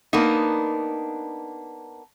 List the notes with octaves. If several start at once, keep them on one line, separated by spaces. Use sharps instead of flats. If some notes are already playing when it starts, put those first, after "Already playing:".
A#3 B3 D4 D#4